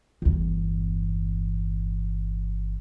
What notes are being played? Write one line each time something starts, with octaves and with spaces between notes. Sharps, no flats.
G1 E2